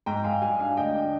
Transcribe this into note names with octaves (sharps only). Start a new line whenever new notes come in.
G#2 G5 A#5
G#2 F5 G#5
G3 F5 G#5
D4 F5 G#5
D2 D#5 G5
D4